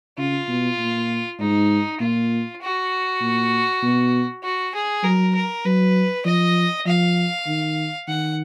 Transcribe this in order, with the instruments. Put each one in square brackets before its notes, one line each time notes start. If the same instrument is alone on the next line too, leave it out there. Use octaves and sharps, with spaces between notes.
[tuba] C#3 [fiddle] F4
[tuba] B2
A#2
[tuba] G#2 [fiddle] D#4
[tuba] A#2 [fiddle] F4
[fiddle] F#4
[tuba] A#2
B2
[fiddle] F#4
G#4
[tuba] F#3 [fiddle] A#4
[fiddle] A#4
[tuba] F#3 [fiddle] B4
[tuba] F3 [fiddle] D#5
[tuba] F3 [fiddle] F5
[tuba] D#3
[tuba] D#3 [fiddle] F#5